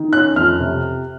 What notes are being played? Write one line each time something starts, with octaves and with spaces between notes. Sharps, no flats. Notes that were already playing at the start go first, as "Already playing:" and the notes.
Already playing: D#3
C#4 F#6
F2 F6
C3